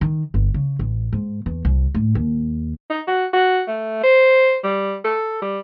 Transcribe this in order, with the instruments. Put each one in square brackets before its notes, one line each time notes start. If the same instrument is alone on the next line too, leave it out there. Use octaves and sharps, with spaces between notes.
[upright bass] D#3
G1
C#3
A1
G#2
E2
C2
A2
D#2
[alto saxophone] D#4
F#4
F#4
A3
C5
G3
A4
G3